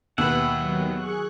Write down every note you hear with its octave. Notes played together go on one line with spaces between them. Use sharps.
D#2 B2 B4 E5 F#5
D#3 F#3
G#4 C#6 F#6